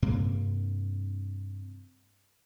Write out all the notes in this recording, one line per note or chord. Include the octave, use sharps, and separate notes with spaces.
G2 C3 A#3